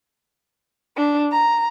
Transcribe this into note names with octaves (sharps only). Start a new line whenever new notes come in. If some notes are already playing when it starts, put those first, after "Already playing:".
D4
A#5